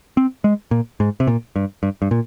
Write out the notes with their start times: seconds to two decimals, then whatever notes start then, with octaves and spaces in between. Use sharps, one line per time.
0.17 C4
0.44 G#3
0.71 A#2
1.00 G#2
1.20 C3
1.27 A#2
1.56 G2
1.83 G2
2.02 G2
2.11 A#2